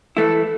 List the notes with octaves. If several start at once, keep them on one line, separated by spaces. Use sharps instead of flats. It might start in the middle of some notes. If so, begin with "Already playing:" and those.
E3 A3 E4 A4